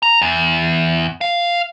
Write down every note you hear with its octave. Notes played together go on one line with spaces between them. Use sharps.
A#5
E2
F5